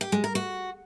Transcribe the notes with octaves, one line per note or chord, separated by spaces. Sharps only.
G4
G#3
A#4
F#4